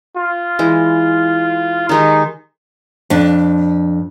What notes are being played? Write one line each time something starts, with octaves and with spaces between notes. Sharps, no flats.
F4
E3 G#3
D#3 G#3 D#4 G4
F2 D4